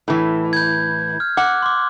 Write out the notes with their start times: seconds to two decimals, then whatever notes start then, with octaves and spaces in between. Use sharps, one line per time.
0.08 A2 E3
0.53 G6 G#6
1.20 F6
1.37 F#5 D6 F#6
1.62 C6 D6